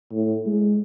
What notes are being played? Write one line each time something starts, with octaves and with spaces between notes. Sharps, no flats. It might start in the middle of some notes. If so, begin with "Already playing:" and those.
A2
G#3